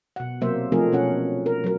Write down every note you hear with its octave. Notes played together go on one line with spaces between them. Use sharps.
B2 F#5
C3 F#3 A#3 C5 E5
F3 A3 C4 D#4 G#4 A#4
B2 C#4 F#5
A#4
F#3 A#4